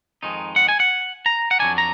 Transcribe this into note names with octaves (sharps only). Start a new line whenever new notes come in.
F2 D#3 G#3 D#4
F#5
G#5
F#5
A#5
F#5
F2 D#3 F#3 D4 G#5
A#5